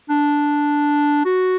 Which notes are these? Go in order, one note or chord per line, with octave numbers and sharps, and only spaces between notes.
D4
F#4